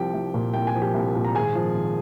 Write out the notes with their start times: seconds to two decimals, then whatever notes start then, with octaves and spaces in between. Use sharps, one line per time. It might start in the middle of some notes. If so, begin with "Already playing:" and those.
Already playing: C2 F3 G4 G5
0.14 C2
0.34 A#2
0.54 C2 G5
0.67 G#5
0.74 F3
0.82 G4 G5
0.94 C2
1.15 A#2
1.25 A#5
1.35 G#1 G#4 G#5
1.55 F3
1.75 G#1